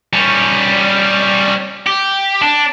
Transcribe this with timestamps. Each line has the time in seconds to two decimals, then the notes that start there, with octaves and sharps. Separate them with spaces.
0.13 G3 C#4
1.86 G4
2.42 D4